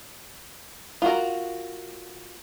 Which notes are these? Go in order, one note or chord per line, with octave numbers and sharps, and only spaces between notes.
F4 F#4 A#4